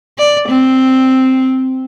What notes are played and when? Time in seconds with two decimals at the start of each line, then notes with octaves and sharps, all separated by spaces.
0.18 D5
0.49 C4